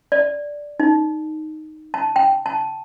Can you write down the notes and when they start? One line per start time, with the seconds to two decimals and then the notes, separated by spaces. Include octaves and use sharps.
0.12 D5
0.80 D#4
1.94 A5
2.16 G5
2.46 A5